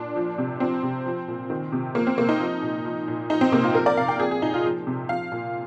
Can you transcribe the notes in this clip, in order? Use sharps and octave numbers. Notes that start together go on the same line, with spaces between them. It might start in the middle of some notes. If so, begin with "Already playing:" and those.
Already playing: A#2 D4
F3
C3
F3 C4
C3
F3
A#2
D#3
C3
F3 A#3
C4
C3 A#3
D#4
F3
A#2
F3
A#2
F3 D#4
C4
C3 A#3
F4
F3 A#4
D5
C3 F5
G5
F3 G#4
G#4
A#2 D#4
F4
F3
C3
F3 F5
A#2